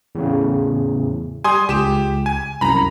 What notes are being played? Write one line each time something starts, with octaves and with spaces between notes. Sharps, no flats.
E2 A2 C#3
G3 G#5 C6 D#6
C#2 G4 E7
G#5
C2 F#2 A#5 B5